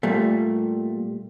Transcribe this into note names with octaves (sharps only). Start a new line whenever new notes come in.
A#2 G3 A3